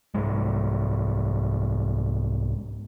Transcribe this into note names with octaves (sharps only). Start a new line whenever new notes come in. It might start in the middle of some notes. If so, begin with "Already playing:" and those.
C2 G#2 G#3